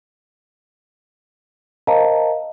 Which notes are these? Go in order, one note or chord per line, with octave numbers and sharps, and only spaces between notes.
A#4 C5 D#5 F5 A5 A#5